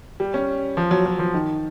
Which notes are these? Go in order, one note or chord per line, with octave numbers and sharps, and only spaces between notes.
G3
C#4
F3
F#3
F#3
F3
D#3